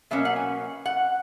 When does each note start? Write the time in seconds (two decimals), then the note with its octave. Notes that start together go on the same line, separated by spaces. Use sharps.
0.11 B2 F#3 A#3 C#4 E5
0.25 F#5
0.36 G#5
0.86 F#5